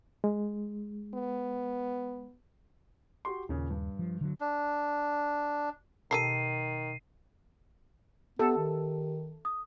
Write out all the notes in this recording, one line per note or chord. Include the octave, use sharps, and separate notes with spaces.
G#3
B3
F#4 G4 C6
D#2 A#2 C#3
G2
F3
D3 E3 F#3
D4
B2 D#3 G4 A4 A#4 C7 D#7
B3 G4 A4
D#3
D#6